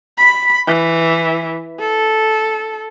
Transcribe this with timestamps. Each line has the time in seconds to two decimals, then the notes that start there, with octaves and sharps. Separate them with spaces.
0.18 B5
0.67 E3
1.80 A4